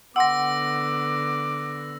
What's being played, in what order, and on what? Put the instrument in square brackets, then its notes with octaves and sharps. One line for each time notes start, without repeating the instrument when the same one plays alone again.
[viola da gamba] D3 B3 [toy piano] F#5 C6 [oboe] D6 [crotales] E6 A#6